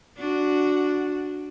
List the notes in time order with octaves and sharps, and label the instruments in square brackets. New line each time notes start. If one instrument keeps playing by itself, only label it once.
[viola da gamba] D4 F#4